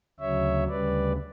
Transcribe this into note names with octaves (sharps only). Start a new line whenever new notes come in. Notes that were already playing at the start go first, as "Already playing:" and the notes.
D2 C#3 F#3 C#5 E5
D2 C#3 G3 B4 D5